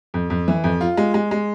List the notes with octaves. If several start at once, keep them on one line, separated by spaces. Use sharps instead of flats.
F2
F2
E3
F2
F4
G#3
G#3
G#3